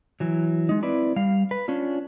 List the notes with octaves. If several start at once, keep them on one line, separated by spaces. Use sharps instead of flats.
E3 F#3
G#3 D#4
C4 E4 B4 D5
G3 F5
B4
C#4 D4 F4